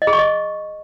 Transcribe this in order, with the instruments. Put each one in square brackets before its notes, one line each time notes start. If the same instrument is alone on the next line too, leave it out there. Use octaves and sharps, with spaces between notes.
[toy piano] D#5
G#4
C#6
D#5